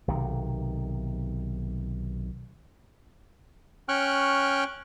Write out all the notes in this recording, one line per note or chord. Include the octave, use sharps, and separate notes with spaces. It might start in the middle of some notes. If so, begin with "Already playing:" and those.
B1 C3 D#3
C#4 G5 C#6 F6 F#6